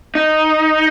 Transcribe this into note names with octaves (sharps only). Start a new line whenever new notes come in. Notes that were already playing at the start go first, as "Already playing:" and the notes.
D#4